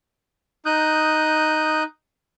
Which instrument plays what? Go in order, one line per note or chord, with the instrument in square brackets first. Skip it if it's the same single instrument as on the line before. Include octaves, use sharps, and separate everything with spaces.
[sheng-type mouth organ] D#4 D#6 F#6 G6